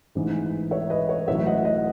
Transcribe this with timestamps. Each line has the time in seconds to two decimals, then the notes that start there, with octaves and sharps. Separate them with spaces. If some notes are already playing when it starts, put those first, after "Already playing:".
0.15 A1 G#2 E3 G#3
0.71 C#5 E5
0.90 B4 D#5
1.09 C#5
1.28 A1 A2 F#3 C#5 E5
1.46 D#5 F#5
1.65 D#5 F#5